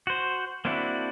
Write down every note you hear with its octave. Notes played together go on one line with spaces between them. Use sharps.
F#4 C5
A#3 C4 D4 E4 F#4